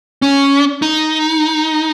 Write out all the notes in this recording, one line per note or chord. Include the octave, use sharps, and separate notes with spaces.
C#4
D#4